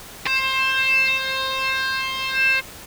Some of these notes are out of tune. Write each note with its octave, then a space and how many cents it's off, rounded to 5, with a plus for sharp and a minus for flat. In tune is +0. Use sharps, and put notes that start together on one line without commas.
C5 +20